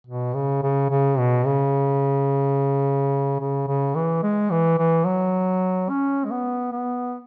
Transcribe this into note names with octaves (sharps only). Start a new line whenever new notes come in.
B2
C#3
C#3
C#3
B2
C#3
C#3
C#3
E3
G#3
E3
E3
F#3
C#4
G#3
B3
B3